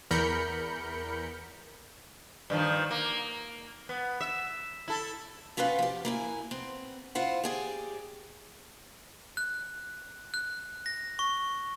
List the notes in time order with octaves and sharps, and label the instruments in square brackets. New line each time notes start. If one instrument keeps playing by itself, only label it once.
[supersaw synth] E2 A#4 B5 G6 C#7
[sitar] G2 D#3 F3
A#3
B3
E5
E4 A4
[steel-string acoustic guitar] B3 C#4 F4 B4 F5 F#5
F3 G4
A#3 E4 G#5
B3 C4
E4 F4 C5 F#5
G4 G#4 D5
[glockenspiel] F#6
F#6
A#6
C#6